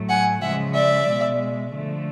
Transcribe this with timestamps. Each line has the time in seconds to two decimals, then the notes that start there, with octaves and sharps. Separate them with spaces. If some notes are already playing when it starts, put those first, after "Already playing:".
Already playing: A2 F#3 A3
0.09 F#5 G#5
0.42 C#3 F3 G#3 E5 F#5
0.74 D5 E5
1.07 B2 G#3
1.73 D3 F3 A3